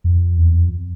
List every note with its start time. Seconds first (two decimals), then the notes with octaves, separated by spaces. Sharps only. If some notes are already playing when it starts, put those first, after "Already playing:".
0.04 F2
0.37 E2
0.54 F2